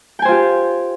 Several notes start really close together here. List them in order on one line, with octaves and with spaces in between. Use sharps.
G5 G#5 C5 F4 G4